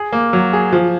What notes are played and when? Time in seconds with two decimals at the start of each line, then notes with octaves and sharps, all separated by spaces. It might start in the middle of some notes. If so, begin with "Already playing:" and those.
Already playing: G#4
0.13 A#3
0.33 F#3
0.53 G#4
0.73 F3